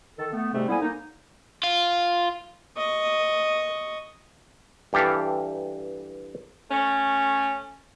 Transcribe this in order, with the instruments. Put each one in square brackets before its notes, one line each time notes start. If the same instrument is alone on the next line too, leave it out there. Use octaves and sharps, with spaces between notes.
[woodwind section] D#3 A4
A3 B3
G#2 C3 G3 A3 C4
F2 G3 A#3 B3 E4 G#5
A#3 D#4
[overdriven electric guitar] F4
[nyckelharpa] D#5 C#6
[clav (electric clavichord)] G2 E3 G4 A4 F5
[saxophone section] A3 C#4